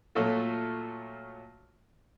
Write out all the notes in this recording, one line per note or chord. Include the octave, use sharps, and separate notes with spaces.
A#2 F#3 A3 F4 A4